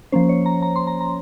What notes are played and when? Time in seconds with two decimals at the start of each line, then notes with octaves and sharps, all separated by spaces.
0.12 F3 A#3 C#4 C5
0.29 C#5
0.46 A#5
0.62 A#5
0.76 C6
0.87 A#5
1.01 A#5